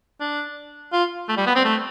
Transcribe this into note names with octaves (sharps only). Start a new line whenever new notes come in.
D4
F4
A3
G3
B3
C4
A3